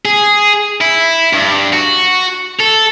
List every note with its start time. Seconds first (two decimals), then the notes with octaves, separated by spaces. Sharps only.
0.05 G#4
0.81 E4
1.33 G2
1.73 F#4
2.59 A4